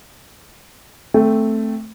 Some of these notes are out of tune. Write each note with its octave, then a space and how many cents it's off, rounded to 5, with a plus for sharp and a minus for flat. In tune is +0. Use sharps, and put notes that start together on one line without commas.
A3 +0 C4 +0